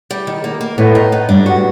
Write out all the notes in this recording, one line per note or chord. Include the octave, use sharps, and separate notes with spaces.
G3
D#3
A#3
A#3
A2 B3
D#4
B3
G2 D4
F#4